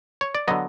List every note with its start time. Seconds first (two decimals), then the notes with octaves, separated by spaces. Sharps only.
0.21 C#5
0.35 D5
0.48 D3 F#3 B3 D#5